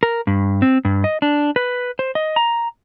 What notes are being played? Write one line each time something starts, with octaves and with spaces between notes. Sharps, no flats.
A#4
G2
C4
G2
D#5
D4
B4
C5
D#5
A#5